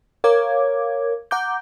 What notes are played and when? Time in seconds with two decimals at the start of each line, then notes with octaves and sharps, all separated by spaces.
0.24 A#4 C#5 F5 D6 G#6
1.31 F#5 A#5 D6 G6